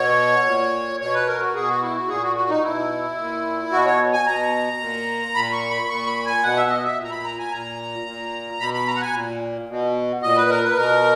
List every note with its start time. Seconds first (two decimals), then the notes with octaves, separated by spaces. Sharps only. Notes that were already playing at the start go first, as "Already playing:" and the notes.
Already playing: B2 C#5
0.46 A#2
1.00 B2 C#5
1.14 B4
1.27 A#4
1.40 F#4
1.55 B2 G#4
1.68 F#4
1.82 E4
1.95 F#4
2.08 A#2 G#4
2.23 F#4
2.36 F#4
2.49 D#4
2.63 B2 E4
3.17 A#2
3.72 B2 F#4
3.86 C#5
4.13 G#5
4.26 B2 A#5
4.80 A#2
5.35 A#2 B5
5.53 C#6
5.70 B5
5.88 A#2 C#6
6.07 B5
6.25 G#5
6.43 B2 F#5
6.57 E5
6.70 D#5
6.84 E5
6.97 A#2
7.04 A#5
7.11 B5
7.24 A#5
7.38 G#5
7.51 A#2 A#5
8.06 A#2
8.60 B2 B5
8.74 B5
8.87 A#5
8.96 F#5
9.01 G#5
9.14 A#2
9.69 B2
10.22 A#2 D#5
10.36 B4
10.50 A#4
10.63 B4
10.77 B2 A#4